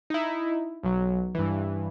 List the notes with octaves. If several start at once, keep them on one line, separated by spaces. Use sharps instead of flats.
D#4 E4
B1 F#3
G2 E3